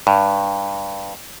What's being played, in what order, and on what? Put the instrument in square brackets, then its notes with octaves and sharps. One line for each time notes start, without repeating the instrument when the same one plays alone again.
[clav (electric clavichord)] G2